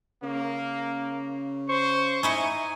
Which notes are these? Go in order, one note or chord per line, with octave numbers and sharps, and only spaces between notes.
C#3 A#3
C5 C#6
D#4 E4 E5 G#5